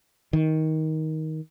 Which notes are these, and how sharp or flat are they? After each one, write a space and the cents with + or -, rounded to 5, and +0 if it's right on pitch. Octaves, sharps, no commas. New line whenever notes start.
D#3 +15